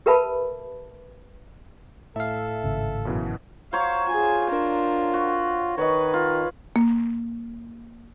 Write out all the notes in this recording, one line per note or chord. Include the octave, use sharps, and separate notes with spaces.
G4 A#4 B4 E5 A5 B5
A2 A4 E5 F5
G#1 C#3
F#2 B2 E3
F#3 C5 C#5 F5
F4 G#4 G#5
D4 A#4
F#4
D#3 B4 C#5 D#5
F4
A#3